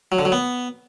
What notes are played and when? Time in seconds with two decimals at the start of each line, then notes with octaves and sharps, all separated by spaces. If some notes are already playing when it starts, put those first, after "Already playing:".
0.12 F#3
0.19 D3
0.25 F#3
0.32 B3